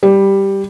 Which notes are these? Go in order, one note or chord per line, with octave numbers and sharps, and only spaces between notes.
G3